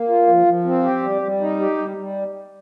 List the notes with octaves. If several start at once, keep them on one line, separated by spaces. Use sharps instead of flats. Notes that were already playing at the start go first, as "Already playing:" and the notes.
Already playing: A#3
F4
F3
F3
C4
G4
G3
G3
D#4
G4
G3
G3